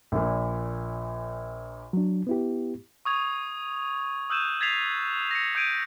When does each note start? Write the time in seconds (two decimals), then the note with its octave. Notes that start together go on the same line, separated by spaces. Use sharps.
0.12 A#1 A#2
1.93 F#3 D4
2.27 B3 E4 G4
3.05 C#6 D#6 G#6 F7
4.30 D#6 E6 F#6 G6 D#7 E7
4.60 D#6 G#6 A6 B6 C7 F7
5.31 A#6 C#7
5.55 D#6 G6 G#6 D7 D#7